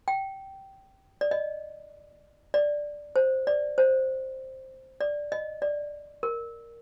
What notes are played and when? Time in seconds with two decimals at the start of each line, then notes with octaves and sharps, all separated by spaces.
0.08 G5
1.21 D5
1.31 D#5
2.54 D5
3.16 C5
3.47 D5
3.78 C5
5.01 D5
5.32 D#5
5.62 D5
6.23 A#4